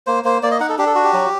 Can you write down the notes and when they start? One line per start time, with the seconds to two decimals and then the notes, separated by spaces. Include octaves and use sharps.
0.07 A#3 C5
0.24 A#3 C5
0.43 A#3 D5
0.51 D#5
0.60 D#4 F#5
0.69 A4
0.78 D4 G4
0.86 A4
0.95 F#4
1.04 G4
1.13 F#3